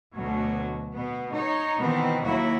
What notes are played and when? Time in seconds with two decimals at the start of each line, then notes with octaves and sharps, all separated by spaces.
0.13 D2 B2 F#3
0.93 B2 B3
1.33 D#4 C#5
1.79 B2 D#3 E3 B3 C4
2.24 D#2 F#3 A#3 E4 F#4